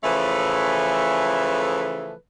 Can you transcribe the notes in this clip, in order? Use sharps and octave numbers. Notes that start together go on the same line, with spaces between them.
C#3 E3 F3 A3 A4 B4